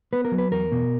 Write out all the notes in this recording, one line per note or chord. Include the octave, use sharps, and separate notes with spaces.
B3 B4
A#4
F#3
B4
E2 A#4
B2